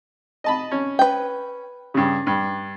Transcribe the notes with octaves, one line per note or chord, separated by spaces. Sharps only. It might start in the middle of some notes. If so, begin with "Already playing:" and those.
D#5 A5 B5
C#4
B4 G5
G2 C#3
G2